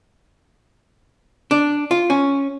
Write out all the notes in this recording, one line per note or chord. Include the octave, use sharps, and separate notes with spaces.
D4
F4
C#4